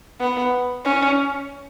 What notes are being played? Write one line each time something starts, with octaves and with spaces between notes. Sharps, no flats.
B3
C#4